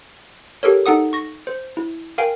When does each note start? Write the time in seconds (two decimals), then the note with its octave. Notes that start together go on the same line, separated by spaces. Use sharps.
0.63 G4 A4 A#4 C#5
0.86 D#4 A4 F#5 D#6
1.13 C#6 A#6
1.47 C5
1.77 E4
2.18 A#4 F5 G5 G#5